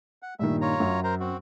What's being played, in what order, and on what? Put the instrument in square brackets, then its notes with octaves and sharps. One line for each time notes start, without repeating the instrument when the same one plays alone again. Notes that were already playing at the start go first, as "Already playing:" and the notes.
[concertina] F#5
[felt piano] G2 A#2 D#3 [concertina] E5
[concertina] F4 C#5 A#5
[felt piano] F#2
[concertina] A#4 C5 A#5
C4 F#4